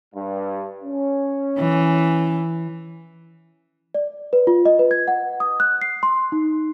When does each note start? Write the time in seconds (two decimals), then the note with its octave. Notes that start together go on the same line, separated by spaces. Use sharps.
0.15 G2
0.84 C#4
1.58 E3
3.95 D5
4.33 B4
4.47 F4
4.65 D#5
4.79 B4
4.91 G#6
5.08 F#5
5.40 D#6
5.60 F#6
5.82 C7
6.03 C6
6.32 D#4